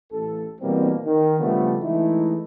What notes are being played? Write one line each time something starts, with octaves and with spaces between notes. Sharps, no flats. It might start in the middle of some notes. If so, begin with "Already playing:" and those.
A1 A4
B2 E3 G3 A#3 C4
D#3
C#3 F3 G3 A3 B3 D4
E3 G#3 A3 D#4 E4